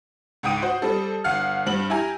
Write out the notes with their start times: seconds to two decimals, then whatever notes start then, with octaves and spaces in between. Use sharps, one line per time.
0.43 C#2 G#2 G5 D#6 D#7
0.62 F#4 C5
0.82 G3 C4 A4
1.24 G1 F5 F#5 F6
1.66 G2 C4 F#7
1.90 E4 G4 G#5 A#5